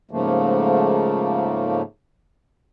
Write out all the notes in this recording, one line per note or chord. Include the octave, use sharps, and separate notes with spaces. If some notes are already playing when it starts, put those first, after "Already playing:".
G#2 C#3 F3 A3 A#3